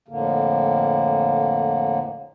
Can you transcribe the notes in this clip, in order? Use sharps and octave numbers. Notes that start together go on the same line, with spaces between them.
F2 A2 D3 A#3